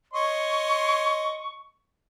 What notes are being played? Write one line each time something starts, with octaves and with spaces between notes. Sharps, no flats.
C#5 D#5 C6 C#6